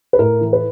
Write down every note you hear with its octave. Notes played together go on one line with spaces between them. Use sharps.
B4
A2 A#4
E3
B4